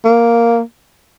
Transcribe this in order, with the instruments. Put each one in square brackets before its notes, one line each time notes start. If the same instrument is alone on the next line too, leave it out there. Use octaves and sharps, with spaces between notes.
[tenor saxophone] A#3